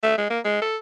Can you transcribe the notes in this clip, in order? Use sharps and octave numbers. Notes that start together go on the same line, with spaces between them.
A3
G#3
A#3
G#3
A4